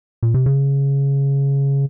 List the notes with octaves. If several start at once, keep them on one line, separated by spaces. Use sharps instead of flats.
A#2
C3
C#3